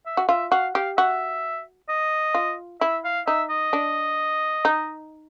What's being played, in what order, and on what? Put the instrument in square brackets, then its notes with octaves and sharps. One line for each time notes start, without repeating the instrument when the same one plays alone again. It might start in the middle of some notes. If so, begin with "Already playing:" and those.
[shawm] E5
[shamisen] F#4
[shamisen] F4 [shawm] E5
[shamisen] F#4 [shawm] F5
[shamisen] G4 [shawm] F5
[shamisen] F#4 [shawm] E5
[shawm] D#5
[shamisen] F4
[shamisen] E4 [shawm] E5
[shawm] F5
[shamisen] D#4 [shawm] E5
[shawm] D#5
[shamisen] D4
D#4